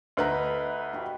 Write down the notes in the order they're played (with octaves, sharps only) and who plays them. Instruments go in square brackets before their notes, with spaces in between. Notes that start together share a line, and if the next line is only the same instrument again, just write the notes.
[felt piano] D2 B4 A#5 [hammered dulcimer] D#5 B5
[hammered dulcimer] F#4 G4